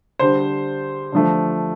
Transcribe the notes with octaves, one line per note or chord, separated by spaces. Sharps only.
D3 G3 C5
D3 F3 A3